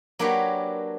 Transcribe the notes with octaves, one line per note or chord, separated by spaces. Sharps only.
F#3 A#3 D4 G4 B4 C#5